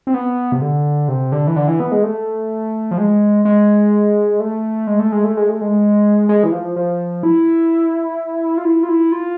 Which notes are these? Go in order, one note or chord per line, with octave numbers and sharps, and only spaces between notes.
C4
B3
C3
D3
C3
D3
E3
D3
E3
B3
G#3
A3
F3
G#3
G#3
A3
G#3
A3
G#3
A3
G#3
A3
G#3
G#3
E3
F3
F3
E4
F4
E4
F4
E4
F4